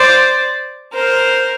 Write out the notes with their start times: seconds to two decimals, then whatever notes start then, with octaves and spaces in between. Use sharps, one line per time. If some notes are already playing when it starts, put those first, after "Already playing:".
Already playing: C5 D5
0.94 A#4 C5